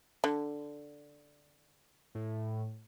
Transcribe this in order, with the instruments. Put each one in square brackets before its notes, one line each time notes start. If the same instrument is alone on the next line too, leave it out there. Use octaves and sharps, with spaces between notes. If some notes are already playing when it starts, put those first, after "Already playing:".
[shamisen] D3
[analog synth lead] A2